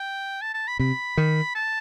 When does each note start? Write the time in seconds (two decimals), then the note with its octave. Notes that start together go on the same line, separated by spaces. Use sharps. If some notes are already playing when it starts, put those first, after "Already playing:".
Already playing: G5
0.41 A5
0.54 A5
0.67 B5
0.79 C3 B5
1.17 D#3
1.55 A5